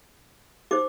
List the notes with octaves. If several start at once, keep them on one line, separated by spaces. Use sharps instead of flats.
D#4 G4 C5 D6